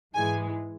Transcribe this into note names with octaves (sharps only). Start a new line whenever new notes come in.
G#2 E3 G#3 G#5